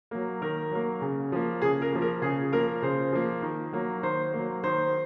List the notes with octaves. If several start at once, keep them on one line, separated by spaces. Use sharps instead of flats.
F#3 A#3
D#3 A#4
F#3 A#3
C#3
F3 A#3
C#3 G#4
A#4
F3 A#3
A#4
C#3 G#4
F3 A#3 A#4
C#3 C5
F3 A#3
D#3
F#3 A#3
D#3 C5
F#3 A#3
D#3 C5